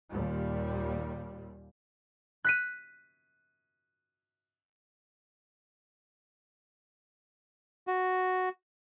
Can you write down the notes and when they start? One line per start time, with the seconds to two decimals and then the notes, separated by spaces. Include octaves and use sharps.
0.11 D#2 A#2 G3
2.44 F#6 B6 D#7
7.87 F#4